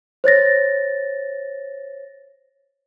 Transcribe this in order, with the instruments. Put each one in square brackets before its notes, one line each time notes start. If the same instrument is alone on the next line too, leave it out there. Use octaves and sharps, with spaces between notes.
[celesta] C5 C#5 A6 A#6